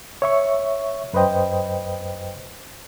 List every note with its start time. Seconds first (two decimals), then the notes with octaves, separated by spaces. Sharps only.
0.22 C#5 E5 C#6
1.13 F#2 B4 C5 D#5 G5